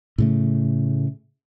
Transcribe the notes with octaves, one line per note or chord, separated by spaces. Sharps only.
A2 C#3 A3